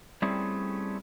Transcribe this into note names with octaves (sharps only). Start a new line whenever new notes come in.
G3 A3 C4 C#4 E4 G#4